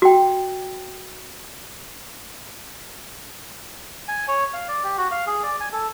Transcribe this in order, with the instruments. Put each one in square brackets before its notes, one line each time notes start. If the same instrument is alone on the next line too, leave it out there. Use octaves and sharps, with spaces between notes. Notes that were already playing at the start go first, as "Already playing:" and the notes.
[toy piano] F#4 G5
[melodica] G#5
C#5
F5
D5
G4
F#4
F5
G#4
D5
G#5
A4